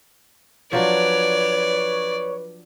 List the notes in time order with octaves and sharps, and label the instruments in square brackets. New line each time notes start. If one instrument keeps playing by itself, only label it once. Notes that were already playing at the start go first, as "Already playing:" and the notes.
[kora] F3 F#3 D4 [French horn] B4 [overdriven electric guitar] C#5 [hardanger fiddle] D5